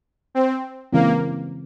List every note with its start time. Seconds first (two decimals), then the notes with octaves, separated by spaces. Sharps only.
0.35 C4
0.93 C#3 E3 G#3 A#3 C4